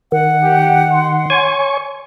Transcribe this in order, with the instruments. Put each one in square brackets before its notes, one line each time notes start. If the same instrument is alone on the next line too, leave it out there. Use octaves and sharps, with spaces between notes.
[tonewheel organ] D#3 [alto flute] F#5
[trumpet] G4
C6
[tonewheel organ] C#5 G#5 C#6